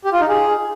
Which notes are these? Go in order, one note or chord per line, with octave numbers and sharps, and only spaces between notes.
G4
F4
D#4
G#4